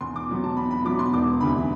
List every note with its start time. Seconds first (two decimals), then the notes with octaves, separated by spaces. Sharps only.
0.01 E2 C6
0.16 D6
0.29 B2 F#3 B3
0.44 A5
0.56 E2 B5
0.71 B5
0.84 B2 F#3 B3 D6
0.99 C6
1.13 E1 D6
1.40 D2 C3 E3 B5